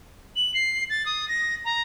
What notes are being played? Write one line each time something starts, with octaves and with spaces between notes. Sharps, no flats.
F#7
C7
A6
D#6
A#6
A#5